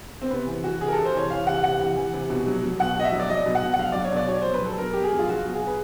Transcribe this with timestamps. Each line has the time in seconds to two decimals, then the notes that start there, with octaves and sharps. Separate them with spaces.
0.22 C4
0.30 C3 B3
0.47 E3
0.64 E3 F#4
0.81 C3 G#4
0.88 A#4
0.93 C3 A4
1.05 C5
1.14 E3 C#5
1.30 E3 F5
1.47 C3 F#5
1.64 C3 F#5
1.80 E3
1.97 E3
2.14 C3
2.30 B2
2.47 F#3
2.63 F#3
2.79 B2 F#5
2.96 B2 D#5
3.04 E5
3.12 F#3
3.20 D5
3.30 F#3 D#5
3.46 B2
3.55 F#5
3.63 B2
3.74 F#5
3.79 F#3 F5
3.92 F#3 D5
4.05 C#5
4.12 B2 D5
4.28 B2 C#5
4.42 F#3 C5
4.54 B4
4.62 F#3 A4
4.74 A4
4.78 B2 A#4
4.94 B2 G4
5.03 G#4
5.13 F#3
5.19 F4
5.29 F#3 F#4
5.45 B2
5.54 G#4
5.62 B2
5.67 B4